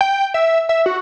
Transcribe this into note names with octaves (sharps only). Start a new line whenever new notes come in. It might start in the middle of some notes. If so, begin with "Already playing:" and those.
G5
E5
E5
F#4